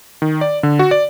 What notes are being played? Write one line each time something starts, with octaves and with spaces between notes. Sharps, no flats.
D#3
D5
D3
F#4
D5